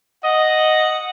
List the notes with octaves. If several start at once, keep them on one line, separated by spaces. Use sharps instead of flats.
D#5 F#5